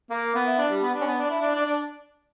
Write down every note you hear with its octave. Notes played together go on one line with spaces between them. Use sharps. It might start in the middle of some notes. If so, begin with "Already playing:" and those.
A#3
B3
E4
D4
G3
B3
D4
C#4
B3
D4
E4
D4
D4
D4